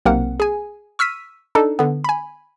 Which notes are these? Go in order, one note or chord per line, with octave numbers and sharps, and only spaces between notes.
B1 C3 A#3 C4 A#4 F#5
G#4 G#5
C#6 E6 F6 B6 D#7
D4 D#4 A4
D3 B3
G#5 B5